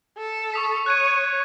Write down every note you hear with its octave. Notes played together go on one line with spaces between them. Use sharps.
A4
C#6 D#6 B6
C#5 F#6 G#6 D#7